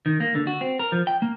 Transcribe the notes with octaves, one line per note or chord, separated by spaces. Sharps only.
D#3
A#3
D3
F#4
C4
A#4
F3
G5
A#3